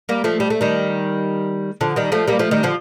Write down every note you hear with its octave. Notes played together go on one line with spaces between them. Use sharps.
G3 A#3
F3 A3
G3
A3
D#3 G3
D3 F3
D#3 G3
F3 A3
G3 A#3
F3 A3
D#3 G3
D3 F3